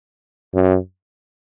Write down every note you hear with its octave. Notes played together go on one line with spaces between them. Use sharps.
F#2